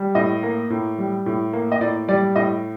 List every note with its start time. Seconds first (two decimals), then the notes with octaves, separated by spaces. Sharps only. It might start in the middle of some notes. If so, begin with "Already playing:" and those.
Already playing: G3
0.15 A2 D#5
0.43 A#3
0.70 A2
0.98 G3
1.26 A2
1.53 A#3
1.72 D#5
1.81 A2 D5
2.08 G3 D5
2.36 A2 D#5